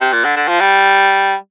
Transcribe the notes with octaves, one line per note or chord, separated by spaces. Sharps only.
C3
A#2
D3
D3
F3
G3